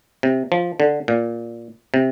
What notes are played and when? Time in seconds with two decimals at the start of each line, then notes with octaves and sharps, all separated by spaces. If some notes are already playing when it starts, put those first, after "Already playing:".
0.23 C3
0.52 F3
0.80 D3
1.08 A#2
1.94 C3